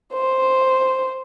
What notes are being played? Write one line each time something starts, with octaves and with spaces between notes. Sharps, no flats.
C5